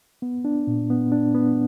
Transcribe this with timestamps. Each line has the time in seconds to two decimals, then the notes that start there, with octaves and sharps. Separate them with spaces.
0.22 B3
0.45 D4
0.67 A#2
0.90 B3
1.12 D4
1.35 B3